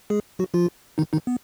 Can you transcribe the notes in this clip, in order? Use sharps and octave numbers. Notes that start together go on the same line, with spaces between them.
G#3 G#4
F#3 F#4
F3 F4
D#3 D#4
D#3 D#4
B3